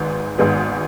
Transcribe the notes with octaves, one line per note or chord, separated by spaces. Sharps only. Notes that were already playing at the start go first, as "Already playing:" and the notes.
Already playing: G#1 G#2 G#3 B3
G#1 G#2 G#3 B3